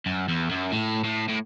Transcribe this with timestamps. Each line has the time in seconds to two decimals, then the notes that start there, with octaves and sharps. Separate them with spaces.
0.06 F#2
0.28 E2
0.51 F#2
0.72 A2
1.04 A2
1.29 A2